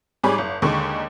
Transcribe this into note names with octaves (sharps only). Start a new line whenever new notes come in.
G#2 G3 G#4 C#5 B5 D6
F#1
D#2 D3 G#3 D#4 C#6